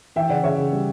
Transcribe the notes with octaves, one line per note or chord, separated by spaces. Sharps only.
E3 E5 G5
C#3 D5 F#5
C#3 C#5 E5
C#3
G3